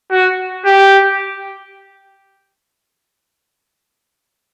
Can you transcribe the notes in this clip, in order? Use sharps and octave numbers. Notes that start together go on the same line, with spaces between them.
F#4
G4